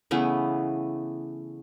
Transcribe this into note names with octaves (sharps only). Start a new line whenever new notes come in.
C#3 E3 A3 B3